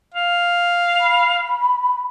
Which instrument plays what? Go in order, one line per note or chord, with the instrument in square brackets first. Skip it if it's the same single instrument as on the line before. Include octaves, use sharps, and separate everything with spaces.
[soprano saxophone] F5
[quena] B5